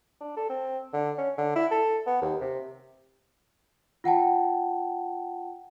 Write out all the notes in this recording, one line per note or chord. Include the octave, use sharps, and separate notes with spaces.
D4
A4
C4
D3
C#4
D3
E4
A4
B3
D#2
C3
F4 F#5 G5 A5